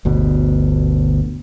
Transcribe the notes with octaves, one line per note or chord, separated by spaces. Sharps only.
G1 D2 B2